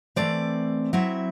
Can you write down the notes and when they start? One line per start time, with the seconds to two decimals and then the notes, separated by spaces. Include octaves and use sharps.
0.16 E3 A3 C4 D5
0.93 F#3 C4 E4 E5